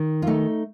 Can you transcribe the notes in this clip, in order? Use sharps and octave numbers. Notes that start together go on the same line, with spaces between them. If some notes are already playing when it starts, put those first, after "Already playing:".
Already playing: D#3
F4
A3 D#4